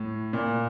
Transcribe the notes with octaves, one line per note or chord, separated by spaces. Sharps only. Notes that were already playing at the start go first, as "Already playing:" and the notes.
Already playing: A2
A#2